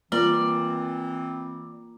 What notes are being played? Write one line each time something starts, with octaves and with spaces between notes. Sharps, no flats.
E3 A#3 C4 F4 D5